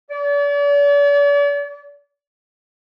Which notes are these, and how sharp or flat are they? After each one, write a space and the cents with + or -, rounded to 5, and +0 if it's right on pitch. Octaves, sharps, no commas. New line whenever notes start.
D5 -40